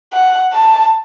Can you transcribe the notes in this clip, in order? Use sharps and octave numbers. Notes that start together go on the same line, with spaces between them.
F#5
A5